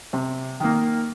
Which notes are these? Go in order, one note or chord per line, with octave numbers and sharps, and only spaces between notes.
C3
D#3 A#3